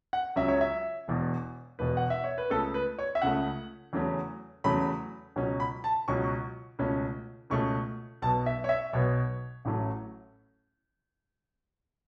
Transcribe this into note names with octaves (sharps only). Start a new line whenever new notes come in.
F#5
C#2 C#3 F#3 C#4 E5
C#5
E5
E1 E2 B2
E1 E2 B2 B4
F#5
E5
C#5
B4
C#2 C#3 A3 A4
B4
C#5
E5
C#2 C#3 A3 F#5
E2 C#3 F#3 A3 C#4
E2 C#3 F#3 A3 C#4 B5
C#2 B2 F#3 C#4
B5
A5
C#2 B2 F#3 C#4 C#6
C#2 B2 A3 C#4
C#2 B2 A3 C#4 C#6
B1 B2 B3 A5
E5
C#5
E5
B1 B2 B3 C#5
A1 A2 F#3 A3 C#4